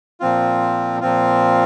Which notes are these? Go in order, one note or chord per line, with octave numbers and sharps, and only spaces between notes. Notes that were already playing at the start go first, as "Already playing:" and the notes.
A#2 F3 C4 F4
A#2 F3 C4 F4